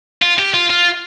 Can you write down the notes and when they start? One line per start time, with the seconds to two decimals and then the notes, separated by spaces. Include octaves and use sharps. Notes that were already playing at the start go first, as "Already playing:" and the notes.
0.22 F4
0.39 G4
0.54 F4
0.70 F4